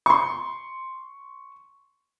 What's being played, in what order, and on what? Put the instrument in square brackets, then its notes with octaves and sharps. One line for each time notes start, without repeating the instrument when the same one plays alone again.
[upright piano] C6 C#6